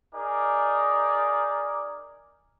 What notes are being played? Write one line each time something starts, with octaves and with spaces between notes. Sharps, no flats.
D#4 G#4 A#4 D5